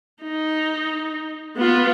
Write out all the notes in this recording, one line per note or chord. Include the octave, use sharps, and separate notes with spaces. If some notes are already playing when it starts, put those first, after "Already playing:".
D#4
B3 F4